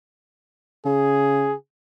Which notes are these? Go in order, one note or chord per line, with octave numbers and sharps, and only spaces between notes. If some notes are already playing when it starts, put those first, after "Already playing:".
C#3 G#4